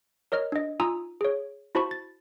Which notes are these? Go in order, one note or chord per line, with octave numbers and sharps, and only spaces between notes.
A#4 C#5 D#5 F6
D4 D#5
D#4 F4 G#5 A#5 D#6 E6
G#4 C#5
E4 F#4 C5 A5 B5 C#6
A6